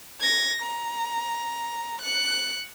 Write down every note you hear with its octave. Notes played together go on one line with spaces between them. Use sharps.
G#6 A#6
A#5
F#6 C#7